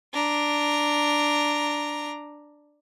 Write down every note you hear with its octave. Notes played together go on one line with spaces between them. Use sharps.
D4 A#5